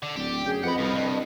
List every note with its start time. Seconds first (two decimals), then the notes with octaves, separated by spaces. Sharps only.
0.03 D3
0.16 D1 G4 D5
0.45 F#2 G#4 G6
0.64 F2 B4 D#5 F#5 B5
0.78 C2 F2 F3
0.95 G2